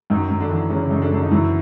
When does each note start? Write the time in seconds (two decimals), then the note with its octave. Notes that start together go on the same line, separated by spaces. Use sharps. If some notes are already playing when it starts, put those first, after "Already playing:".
0.10 F#2 D#3 D#4
0.30 F#2
0.40 D3 D4
0.51 E3
0.70 C#3 C#4
0.91 F#2 D#4
1.02 D3 D4
1.12 F#2 D4
1.23 D#4
1.31 F#2 E3 E4